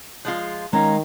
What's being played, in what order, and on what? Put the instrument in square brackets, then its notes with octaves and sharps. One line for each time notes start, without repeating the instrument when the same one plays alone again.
[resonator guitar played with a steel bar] F3 G#3 F4
[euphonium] D#3 [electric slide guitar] G#3 D#5 F5 [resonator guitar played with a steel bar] C#4 [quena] A#5